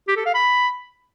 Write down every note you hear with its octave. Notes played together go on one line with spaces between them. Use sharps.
G4
A4
F5
B5